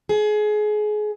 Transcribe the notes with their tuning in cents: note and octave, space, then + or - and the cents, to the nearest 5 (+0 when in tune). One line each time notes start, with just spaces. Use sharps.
G#4 +25